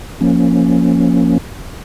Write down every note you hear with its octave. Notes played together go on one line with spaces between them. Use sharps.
F3 A#3 C#4